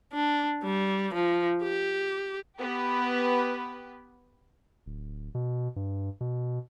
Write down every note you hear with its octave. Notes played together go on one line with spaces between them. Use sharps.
D4
G3
F3
G4
B3 G4 B4
D1
B2
G2
B2